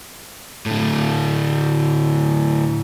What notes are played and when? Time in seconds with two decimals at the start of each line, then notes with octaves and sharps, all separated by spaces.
0.66 A2 D3